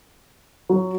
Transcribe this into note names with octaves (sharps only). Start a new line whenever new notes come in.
F#3